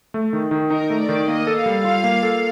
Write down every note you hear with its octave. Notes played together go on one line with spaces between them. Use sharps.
A3
D#3
D#3
D#4 A#4
A3
D5
D#3
A#3 D#5
A4
F5
G3
F4 F5
A#3
A4